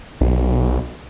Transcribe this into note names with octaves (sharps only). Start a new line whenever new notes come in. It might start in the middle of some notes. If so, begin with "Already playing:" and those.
B1